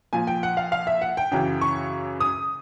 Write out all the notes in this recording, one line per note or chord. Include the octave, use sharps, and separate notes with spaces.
A#2 F3 G#5
G5
F#5
F5
F5
E5
F#5
G5
F#2 C#3 E3 G5
C#6
D#6